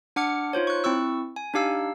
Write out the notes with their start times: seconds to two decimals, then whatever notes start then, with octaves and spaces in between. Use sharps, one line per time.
0.16 D4 F#5 D6 F6 C#7
0.53 D#4 F4 C5 C#5
0.67 C#6 F#6
0.84 C4 E4 C#6 E6
1.36 G#5
1.54 D4 D#4 G4 F5 E6